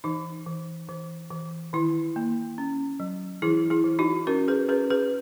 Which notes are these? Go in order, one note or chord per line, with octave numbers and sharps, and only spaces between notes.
E3 D#4
E3
E3
E3
D#3 E4
A#3
C#4
F#3
E3 E4 G#4
E4 G#4
E3
D#4 F#4
C#4 F#4 A#4
G#4 B4
C#4 G#4 B4
G#4 B4